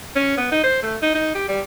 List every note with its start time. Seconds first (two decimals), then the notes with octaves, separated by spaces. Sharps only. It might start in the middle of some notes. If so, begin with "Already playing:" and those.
0.15 C#4
0.37 B3
0.51 D#4
0.63 C5
0.83 A3
1.02 D#4
1.15 D#4
1.35 G4
1.48 G3